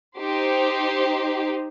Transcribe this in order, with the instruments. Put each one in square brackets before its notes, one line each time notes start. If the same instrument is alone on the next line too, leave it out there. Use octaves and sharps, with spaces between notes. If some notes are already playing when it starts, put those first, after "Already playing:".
[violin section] D#4 G4 C5